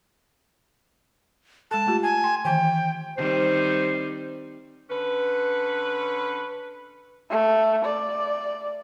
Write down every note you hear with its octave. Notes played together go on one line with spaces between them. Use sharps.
G#3 A4 A5
A3 F4 G4
G#5
G5 C6
D#3 E3 G5
D#3 G3 C4 C5
D3 C#4 B4
A3
D5